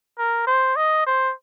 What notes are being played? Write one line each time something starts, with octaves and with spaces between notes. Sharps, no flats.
A#4
C5
D#5
C5